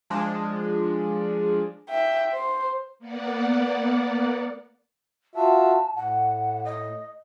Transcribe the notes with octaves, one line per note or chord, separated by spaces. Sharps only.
F3 G#3 D4
E5 G5
C5
A#3 B3 D5 F#5
F4 F#4 E5 A5
A2 F#5
D#5